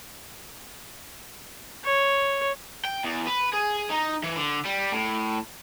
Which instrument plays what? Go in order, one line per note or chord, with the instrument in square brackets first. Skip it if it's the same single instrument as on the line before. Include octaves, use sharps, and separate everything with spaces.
[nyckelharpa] C#5
[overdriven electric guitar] G5
E2
B4
G#4
D#4
E3
D3
G3
A2